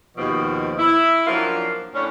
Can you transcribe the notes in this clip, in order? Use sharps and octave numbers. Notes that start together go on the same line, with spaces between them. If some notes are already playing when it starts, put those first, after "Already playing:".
D#2 B2 F3
E4
F3 F#3 A#3 C#4 D4 F4
A2 C#4 D4